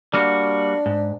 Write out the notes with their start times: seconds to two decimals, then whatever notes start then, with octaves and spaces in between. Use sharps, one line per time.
0.14 G3 A#3 D4 F#4
0.86 G#2